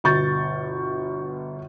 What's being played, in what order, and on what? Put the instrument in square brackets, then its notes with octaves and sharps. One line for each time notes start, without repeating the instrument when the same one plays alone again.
[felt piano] G1 B2 C#6 G6 A6